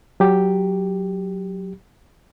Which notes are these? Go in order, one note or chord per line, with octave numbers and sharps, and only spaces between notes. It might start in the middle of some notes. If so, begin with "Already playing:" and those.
F#3 G4